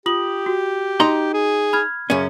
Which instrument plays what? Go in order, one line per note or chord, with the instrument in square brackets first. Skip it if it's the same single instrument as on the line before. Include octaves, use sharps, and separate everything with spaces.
[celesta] F4 D#6 F#7 [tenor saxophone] G4
[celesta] F#4
[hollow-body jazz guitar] D#4 A#5 C6
[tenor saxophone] G#4
[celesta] B5 F6 G#6
[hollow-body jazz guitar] F#2 C#4 [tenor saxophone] C#3